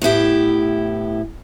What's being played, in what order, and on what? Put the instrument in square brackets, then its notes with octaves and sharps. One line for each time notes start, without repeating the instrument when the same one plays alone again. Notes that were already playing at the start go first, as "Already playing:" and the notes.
[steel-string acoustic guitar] A2 B3 E4 G4